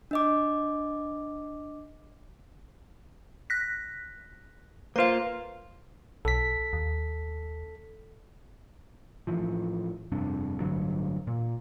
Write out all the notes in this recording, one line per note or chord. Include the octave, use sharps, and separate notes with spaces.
D4 D#5 D6
F#6 A#6 B6
A#3 F4 B4 C5 F5
B1 A4 B6
D#2
A2 E3 F3
F1 G2 C3 D4
A1 G2 D3 F#3
A#2